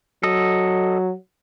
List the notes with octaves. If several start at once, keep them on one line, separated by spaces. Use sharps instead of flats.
F#3 A4 D#5